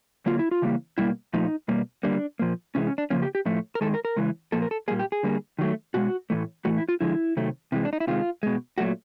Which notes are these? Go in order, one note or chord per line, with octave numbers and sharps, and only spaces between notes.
D3 F#3 A#3 F4
E4
F4
C#3 E3 G3 A#3
B2 G3 A#3 E4
A#2 F3 A3 D#4
B2 G3 A#3
D3 G3 A#3 D4
A#2 F3 A#3
C3 E3 G#3 C#4
C#4
D4
C#3 F3 A#3 C#4
G4
G4
A2 F3 A3
A#4
D#3 G#3 A4
A#4
A#4
C#3 E3 G#3
A#2 F3 A#3 A4
A#4
A4
A#2 G3 A#3 G#4
G4
G#4
D3 G3 A#3
D#3 F#3 A3
B2 G#3 F#4
A2 E3 A3
A2 E3 A3 F#4
E4
F4
D3 F3 G#3 E4
C3 D#3 F#3 A3
C3 E3 G#3
D4
D#4
E4
C3 D#3 G#3 F4
B2 G#3
A#2 F#3 A3 F#4